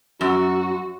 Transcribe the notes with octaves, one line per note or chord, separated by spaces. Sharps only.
F#2 F#4